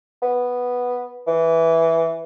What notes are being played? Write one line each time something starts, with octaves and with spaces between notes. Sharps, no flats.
B3
E3